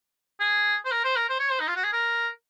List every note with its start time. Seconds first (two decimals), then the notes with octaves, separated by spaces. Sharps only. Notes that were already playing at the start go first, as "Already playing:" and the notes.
0.40 G#4
0.85 C5
0.91 A#4
1.04 C5
1.16 A#4
1.29 C5
1.39 C#5
1.51 C5
1.60 D#4
1.68 F4
1.76 F#4
1.84 G#4
1.93 A#4